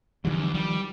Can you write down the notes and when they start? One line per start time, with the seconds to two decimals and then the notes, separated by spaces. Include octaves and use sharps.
0.25 E2 D3 F3 G3
0.54 D#3 F3 G3